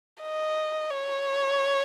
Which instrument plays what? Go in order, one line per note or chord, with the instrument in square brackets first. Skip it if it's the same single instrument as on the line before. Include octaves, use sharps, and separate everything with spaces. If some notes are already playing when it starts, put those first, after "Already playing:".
[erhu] D#5
C#5